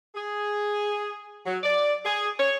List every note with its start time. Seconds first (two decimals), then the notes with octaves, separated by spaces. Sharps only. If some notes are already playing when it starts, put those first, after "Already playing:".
0.15 G#4
1.46 F#3
1.63 D5
2.05 G#4
2.39 C#5